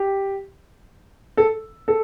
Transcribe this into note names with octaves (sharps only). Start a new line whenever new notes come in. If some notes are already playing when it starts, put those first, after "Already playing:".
Already playing: G4
A4
A4